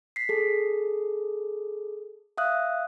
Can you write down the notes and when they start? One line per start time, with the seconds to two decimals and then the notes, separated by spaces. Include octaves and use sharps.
0.16 B6 C7
0.29 G#4 A4
2.38 E5 F5 D#6 F#6